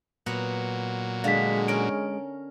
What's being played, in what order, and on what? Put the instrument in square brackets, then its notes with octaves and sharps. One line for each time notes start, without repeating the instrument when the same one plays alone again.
[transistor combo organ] A#2 F#3 [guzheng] B3 F#5 A#5
[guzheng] D3 [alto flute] G#3 [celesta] F5 B6
[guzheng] C#4 A#4 [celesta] D7